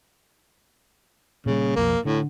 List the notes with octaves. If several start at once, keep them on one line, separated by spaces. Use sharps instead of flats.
A#2 C#3 G3
B1 F2 F3 A#3
A2 D3